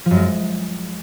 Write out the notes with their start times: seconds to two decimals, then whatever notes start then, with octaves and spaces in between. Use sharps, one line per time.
0.06 F3
0.11 F#2
0.16 G#3